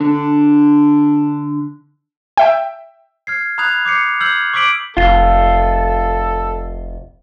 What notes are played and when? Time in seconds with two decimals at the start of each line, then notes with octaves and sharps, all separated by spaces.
0.01 D3 D4
2.37 E5 G5
3.27 F6 G#6 C7
3.58 A#5 B5 D#6 F#6 G#6 F7
3.85 D6 G6 C7 C#7
4.20 E6 F6 G6 G#6 C7 F#7
4.53 C#6 D6 E6 B6 D7 F#7
4.97 F1 F4 A4